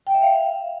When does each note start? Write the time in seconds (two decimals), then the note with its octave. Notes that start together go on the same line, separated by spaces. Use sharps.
0.07 G5
0.14 E5
0.22 F5